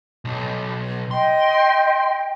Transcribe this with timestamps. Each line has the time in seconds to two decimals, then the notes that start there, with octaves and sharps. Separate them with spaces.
0.25 B1
1.11 D#5 G5 C6